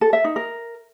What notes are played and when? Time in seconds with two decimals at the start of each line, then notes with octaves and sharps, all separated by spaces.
0.01 A4
0.13 E5
0.24 D#4
0.36 A#4